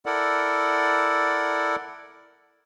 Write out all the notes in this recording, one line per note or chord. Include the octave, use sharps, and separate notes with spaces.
E4 A4 A#4 D5 F#5